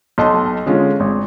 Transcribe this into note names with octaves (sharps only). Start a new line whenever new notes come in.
B1 D#5 A5 C6
D3 G#3 C#4 F4
G#1